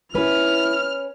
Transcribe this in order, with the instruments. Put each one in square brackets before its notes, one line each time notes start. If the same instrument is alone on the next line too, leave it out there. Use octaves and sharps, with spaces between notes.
[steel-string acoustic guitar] C#4 B4 [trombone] E4 [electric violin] F6